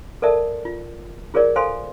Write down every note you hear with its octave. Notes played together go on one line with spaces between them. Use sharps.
A4 A#4 D5 E5 A5
F4
F4 G#4 A#4 C#5 D5
A4 C5 F5 G#5 C6